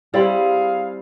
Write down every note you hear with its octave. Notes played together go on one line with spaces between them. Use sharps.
G3 C4 E4 G#4 F5